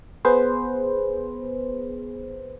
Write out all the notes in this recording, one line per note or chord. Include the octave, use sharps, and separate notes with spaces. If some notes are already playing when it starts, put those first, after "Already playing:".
B3 G#4 B4 C5